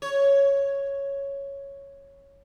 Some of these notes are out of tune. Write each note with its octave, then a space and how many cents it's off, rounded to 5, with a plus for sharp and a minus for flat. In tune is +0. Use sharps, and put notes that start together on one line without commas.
C#5 +0